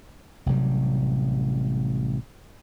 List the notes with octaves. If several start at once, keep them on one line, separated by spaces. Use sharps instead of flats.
A1 C3 F#3 G3